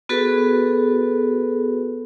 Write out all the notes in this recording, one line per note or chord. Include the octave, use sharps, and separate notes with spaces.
B3 F#4 G#4 A4 B4